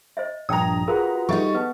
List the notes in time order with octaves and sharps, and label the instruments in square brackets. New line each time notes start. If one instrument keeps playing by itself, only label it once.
[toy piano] C5 D#5 E5
[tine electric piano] A#1 G2 [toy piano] D5 G5 A5 [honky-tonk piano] A#5 D#6
[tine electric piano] F4 B4 F#5 [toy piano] F#4 G#4 A#4
[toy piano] F#4
[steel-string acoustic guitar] G3 D#4 [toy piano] A4 D#5 E5 [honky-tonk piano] C#6 A6
[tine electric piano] B3 [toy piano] B4 A5